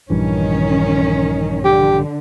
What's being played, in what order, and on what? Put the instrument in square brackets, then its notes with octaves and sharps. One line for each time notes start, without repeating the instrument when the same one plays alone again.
[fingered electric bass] A#1 G2 E3 [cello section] D#3 C#4
[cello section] D3 [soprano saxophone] G4